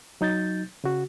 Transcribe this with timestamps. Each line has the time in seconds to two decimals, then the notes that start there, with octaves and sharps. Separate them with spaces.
0.21 F#3 D#4 G6 A6
0.84 C#3 F#4